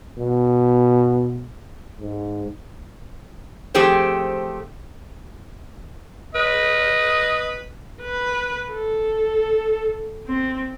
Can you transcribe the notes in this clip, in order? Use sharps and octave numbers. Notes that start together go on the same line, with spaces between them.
B2
G#2
F3 A3 C4 G4 G#4 C5
B4 D#5
B4
A4
C4